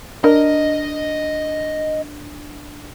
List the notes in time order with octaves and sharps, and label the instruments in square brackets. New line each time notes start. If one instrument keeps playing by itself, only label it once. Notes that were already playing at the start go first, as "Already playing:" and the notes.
[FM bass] D4 [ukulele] A#4 [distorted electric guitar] D#5